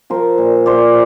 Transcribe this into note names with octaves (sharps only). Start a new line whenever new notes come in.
F3 A#4 C5
A#2
A#2 C5 D5